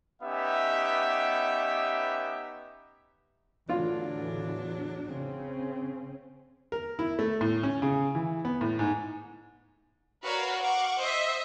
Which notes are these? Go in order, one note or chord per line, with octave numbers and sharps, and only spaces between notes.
B3 C#4 D#4 G4 E5
E2 A2 D3 E3 F#3 D4 F4
C#3 C4 C#4
A#4
E4
A3
A2
C#4
C#3
E3
B3
A2
G#2
F#4 A#4 B4 C#5 D5 F5
F5 F#5 C#6 D6
C5 D#5 E5